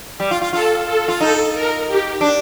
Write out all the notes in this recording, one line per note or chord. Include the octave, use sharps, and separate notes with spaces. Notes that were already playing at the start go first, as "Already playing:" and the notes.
G3
F4
F4
F4 A4
A4
F4
D#4 A4
A#4
G4
D4